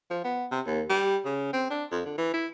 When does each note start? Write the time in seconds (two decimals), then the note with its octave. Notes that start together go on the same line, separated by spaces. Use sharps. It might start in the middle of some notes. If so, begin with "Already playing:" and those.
0.10 F3
0.24 B3
0.51 C3
0.67 D#2
0.90 G3
1.26 C#3
1.53 C4
1.70 D4
1.92 F2
2.06 D3
2.18 E3
2.34 E4